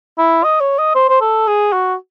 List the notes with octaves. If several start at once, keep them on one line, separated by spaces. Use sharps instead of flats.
E4
D#5
C#5
D#5
C5
C5
A4
G#4
F#4